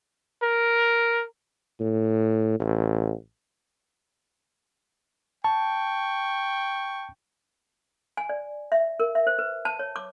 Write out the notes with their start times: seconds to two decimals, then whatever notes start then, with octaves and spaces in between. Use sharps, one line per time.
0.43 A#4
1.80 A2
2.60 A1
5.44 G5 A5 C#6
8.17 G#5
8.29 D5
8.72 E5
9.00 A#4
9.15 E5
9.27 C5
9.39 B4
9.65 A5
9.79 C#5
9.96 D6